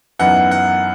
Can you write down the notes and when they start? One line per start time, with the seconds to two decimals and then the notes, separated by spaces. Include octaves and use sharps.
0.19 F#2 E3 B3 D#4 F#5
0.51 F#5